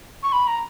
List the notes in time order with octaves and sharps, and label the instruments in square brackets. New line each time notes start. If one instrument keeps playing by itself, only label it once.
[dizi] C#6
B5
A#5